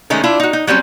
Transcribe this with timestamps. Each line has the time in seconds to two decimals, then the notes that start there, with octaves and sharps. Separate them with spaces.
0.10 D#3 G#3 A3 C#4 D#4
0.24 D4 E4 F4
0.40 D#4 F#4
0.53 D#4
0.67 F#3 G3 C4 C#4